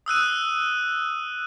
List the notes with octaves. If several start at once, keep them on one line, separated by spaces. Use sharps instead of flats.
D#6 E6 F#6 D#7